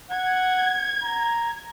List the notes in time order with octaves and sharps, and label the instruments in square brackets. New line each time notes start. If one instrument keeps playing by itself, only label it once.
[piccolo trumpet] F#5 [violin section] G#6
[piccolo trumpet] A#5